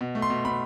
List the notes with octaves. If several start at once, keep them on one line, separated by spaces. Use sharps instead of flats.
B2
A3
C6
B2
B2 B5